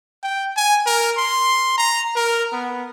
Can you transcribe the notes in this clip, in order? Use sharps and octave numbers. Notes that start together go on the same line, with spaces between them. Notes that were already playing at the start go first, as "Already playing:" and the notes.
G5
G#5
A#4
C6
A#5
A#4
B3